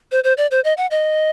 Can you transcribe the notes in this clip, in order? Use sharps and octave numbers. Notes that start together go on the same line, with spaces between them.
C5
C5
D5
C5
D#5
F#5
D#5